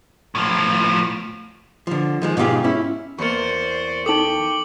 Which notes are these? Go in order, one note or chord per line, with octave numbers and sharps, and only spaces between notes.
A2 F3
D3 F3
D#3 F3 G#3
G#2 B2 D4 F4 G4 G#4
C#4 E4
E2 A#3 C5 D5 C#6 C#7
D#4 A4 G5 D6 F#7